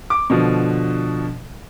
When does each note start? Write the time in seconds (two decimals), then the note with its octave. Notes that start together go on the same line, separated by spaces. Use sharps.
0.10 D6
0.30 B2 D3 F3